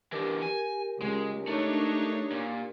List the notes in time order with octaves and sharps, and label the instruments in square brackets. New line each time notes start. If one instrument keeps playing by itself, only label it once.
[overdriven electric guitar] E3 D4 [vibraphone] G4 A#4
[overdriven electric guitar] G#5
[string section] C#2 [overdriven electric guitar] G#3
[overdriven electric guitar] A3 [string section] D4 D#4 C#5
[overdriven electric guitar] A#2